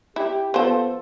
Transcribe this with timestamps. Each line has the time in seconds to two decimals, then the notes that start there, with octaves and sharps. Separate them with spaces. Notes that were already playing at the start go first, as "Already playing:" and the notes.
0.16 E4 G4
0.54 F3 B3 A4 C5